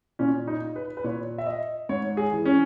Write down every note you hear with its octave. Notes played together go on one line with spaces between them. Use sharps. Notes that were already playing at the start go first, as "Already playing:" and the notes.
A#2 C#4
D#4
B4
B4
A#2 C#5
E5
D#5
G#2 C#5
G#4
E3
C#4